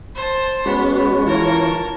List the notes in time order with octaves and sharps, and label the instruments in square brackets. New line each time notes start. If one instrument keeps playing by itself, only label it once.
[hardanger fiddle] C5 A5
[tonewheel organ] G#3 C#4 F#4 [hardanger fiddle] B3
[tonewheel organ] E3 F4 C#5 [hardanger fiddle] A#4 A5